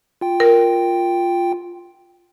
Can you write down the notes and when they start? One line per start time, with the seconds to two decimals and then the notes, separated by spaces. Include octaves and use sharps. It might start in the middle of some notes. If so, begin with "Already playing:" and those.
0.21 F4 G5
0.40 A#4